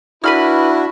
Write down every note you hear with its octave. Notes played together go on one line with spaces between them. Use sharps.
D4 E4 F#4 B4 B5 F6